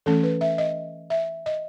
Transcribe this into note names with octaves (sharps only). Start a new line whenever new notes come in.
E3 A3 C#4 A4
B4
E5
D#5
E5
D#5